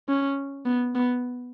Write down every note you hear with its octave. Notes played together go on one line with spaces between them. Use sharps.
C#4
B3
B3